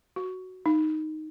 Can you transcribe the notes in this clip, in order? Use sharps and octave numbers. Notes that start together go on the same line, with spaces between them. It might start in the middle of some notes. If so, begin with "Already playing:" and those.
F#4
D#4